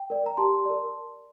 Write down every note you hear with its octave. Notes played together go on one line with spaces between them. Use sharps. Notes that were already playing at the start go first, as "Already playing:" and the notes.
Already playing: G5
A#4 D5
A#5
G4 A5 C6
A#4 D5